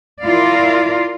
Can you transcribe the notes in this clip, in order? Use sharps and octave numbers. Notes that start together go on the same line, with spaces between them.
E4 F4 A#4 D5 F5